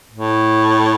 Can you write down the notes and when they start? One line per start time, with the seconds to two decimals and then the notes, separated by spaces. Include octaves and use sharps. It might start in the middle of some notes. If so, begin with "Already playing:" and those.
0.12 A2